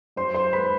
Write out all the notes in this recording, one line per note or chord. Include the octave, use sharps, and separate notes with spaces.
F#2 C5 C6
C5 C6
G#3 B4 B5